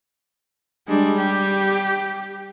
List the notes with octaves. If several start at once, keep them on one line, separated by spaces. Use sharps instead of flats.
G3 G#3 D4
G4